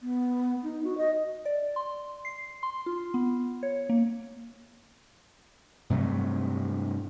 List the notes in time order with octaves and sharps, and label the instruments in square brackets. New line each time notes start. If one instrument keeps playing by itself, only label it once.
[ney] B3
D#4
F#4
D#5
[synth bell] D5
C6
C7
C6
F4
B3
C#5
A#3
[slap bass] G2 C3 F#3 A3